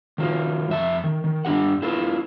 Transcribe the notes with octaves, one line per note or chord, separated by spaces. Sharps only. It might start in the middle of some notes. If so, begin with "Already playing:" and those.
D#3 F#3 F4
F2 E5 A5
D#3
D#3
G2 D4 G4 F#5
E4 F4 A4 B4